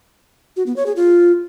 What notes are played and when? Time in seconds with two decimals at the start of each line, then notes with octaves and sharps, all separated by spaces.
0.57 F#4
0.66 B3
0.76 C#5
0.86 G#4
0.96 F4